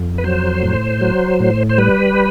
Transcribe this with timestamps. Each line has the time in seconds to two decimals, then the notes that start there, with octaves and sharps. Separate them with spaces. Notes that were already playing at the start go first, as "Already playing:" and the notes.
Already playing: F2
0.18 B4
0.24 F#3 C5
0.62 A2
1.01 F#3
1.40 A2
1.69 C5
1.78 G3 B4